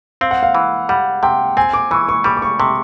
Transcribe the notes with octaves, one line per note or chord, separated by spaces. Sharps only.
C4 F5
F#5
F5
E3
G3 F#5
C3 G5
C4 G#5
D6
E3 C#6
C#6
G3 D6
D6
C#6
C3 C#6